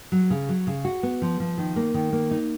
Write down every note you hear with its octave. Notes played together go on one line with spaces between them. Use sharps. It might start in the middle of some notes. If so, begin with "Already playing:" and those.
F#3
C#3
F#3
C#3
F#4
B3
F3
F3
D#3
A#3
D#3
A#3
D#4